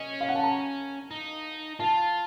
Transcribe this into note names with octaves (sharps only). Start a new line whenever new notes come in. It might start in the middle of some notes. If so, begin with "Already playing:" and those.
Already playing: C#4 D#5
F5
F#5
A5
A#5
D#4
F4 A5